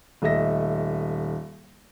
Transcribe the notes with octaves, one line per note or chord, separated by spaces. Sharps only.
D#1 A3 D#5 E5 A#6